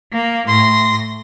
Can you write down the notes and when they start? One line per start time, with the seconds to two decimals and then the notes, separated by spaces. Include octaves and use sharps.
0.13 A#3
0.48 A2 C6 A#6